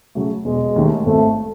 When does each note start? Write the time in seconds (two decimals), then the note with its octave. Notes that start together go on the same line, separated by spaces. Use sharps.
0.15 C#3 F#3 A3
0.45 E1 G#3
0.76 D#2 D#3 A3
1.06 G#1 A3